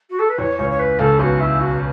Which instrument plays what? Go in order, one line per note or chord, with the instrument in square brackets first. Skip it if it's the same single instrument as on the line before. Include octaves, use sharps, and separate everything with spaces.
[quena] F#4
A4
B4
[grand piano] E2 E3 [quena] C#5
[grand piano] C#2 C#3 [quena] C#5
[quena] C#5
B4
[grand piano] C#2 C#3 [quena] A4
[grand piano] B1 B2 [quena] F#4
[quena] E4
F#4